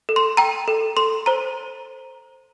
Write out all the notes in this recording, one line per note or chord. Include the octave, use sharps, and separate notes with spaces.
A4
C6
G5 A#5
A4
A4 C6
C5 A#5